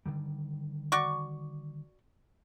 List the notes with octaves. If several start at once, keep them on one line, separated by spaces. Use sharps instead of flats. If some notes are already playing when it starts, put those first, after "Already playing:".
D3 D#3 G3
F#4 D5 C#6